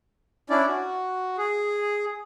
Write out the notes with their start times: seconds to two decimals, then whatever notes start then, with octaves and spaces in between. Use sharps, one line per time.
0.50 C#4 D4 E4 D5
0.68 F#4
1.38 G#4